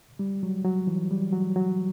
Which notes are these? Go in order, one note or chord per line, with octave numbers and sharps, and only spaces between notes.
G3
F#3
F#3
E3
G3
F#3
F#3